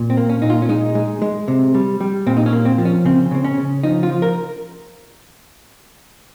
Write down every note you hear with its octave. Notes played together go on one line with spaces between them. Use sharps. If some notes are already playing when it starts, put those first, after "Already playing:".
Already playing: A#2
C4
A#3
C#4
A#2 D#4
F4
C#4
G#3 D#4
G#3
G#3
C3
G3
G3
A#2 C4
D#4
C#4
A#3
C4
F3
C#4
C#3 C4
C#3 C4
C#4
C#3
F3 D#4
F4
F3
A#4